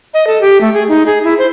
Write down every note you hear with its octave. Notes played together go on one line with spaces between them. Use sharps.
D#5
A4
G4
A3
G#4
D#4
G#4
E4
C5